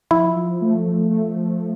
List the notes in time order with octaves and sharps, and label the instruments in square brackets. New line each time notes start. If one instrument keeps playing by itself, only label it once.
[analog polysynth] F3 [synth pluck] E4
[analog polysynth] F3
A3
F3
A3
F3